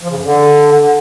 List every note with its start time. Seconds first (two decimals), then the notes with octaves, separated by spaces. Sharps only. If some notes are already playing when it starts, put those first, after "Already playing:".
0.02 F3
0.09 C#3
0.17 F#2
0.24 D3